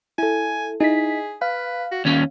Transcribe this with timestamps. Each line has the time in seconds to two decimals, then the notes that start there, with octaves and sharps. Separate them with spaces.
0.18 E4 A4 G#5
0.81 D#4 E4 G#4 B6
1.42 B4 F5
1.92 F#4
2.05 D#2 C#4 C#5